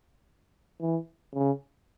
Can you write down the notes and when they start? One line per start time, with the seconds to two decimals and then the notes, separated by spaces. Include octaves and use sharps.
0.81 E3
1.35 C#3